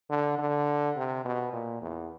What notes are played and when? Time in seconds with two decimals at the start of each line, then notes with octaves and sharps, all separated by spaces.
0.10 D3
0.39 D3
0.97 C3
1.25 B2
1.53 A#2
1.82 E2